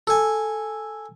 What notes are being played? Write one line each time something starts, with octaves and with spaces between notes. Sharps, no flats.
A4 G#5